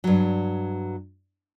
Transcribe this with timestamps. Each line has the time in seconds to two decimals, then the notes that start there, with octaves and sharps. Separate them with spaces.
0.04 G2 F#3